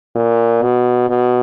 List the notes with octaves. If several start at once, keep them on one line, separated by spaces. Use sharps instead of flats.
A#2
B2
B2